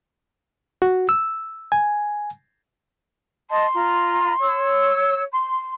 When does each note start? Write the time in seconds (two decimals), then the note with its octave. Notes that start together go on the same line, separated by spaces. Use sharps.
0.82 F#4
1.09 E6
1.72 G#5
3.50 D#5 A5 C6
3.74 F4 A#5
4.42 C#5 E6
5.32 C6